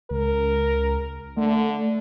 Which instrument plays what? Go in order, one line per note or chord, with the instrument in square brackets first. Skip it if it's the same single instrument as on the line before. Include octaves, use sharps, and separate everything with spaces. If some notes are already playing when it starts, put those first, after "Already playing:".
[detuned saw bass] C#2 [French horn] A#4
[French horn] D3 [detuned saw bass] A3